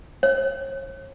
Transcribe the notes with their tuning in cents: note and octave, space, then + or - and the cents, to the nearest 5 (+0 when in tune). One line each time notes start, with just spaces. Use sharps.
C#5 -40